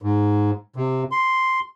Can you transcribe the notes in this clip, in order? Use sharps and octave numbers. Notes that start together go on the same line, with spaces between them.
G#2
C3
C6